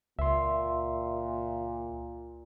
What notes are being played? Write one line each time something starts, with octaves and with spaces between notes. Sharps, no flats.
C#2 A#2 E5 C6